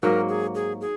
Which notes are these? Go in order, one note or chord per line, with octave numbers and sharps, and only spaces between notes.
G#2 F#3 A#3 A#4
G#4
G#4
G#4